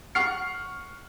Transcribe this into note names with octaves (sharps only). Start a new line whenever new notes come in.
F#5 C#6 F6 C7